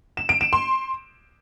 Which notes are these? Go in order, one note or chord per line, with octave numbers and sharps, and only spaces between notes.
E7
D7
E7
C6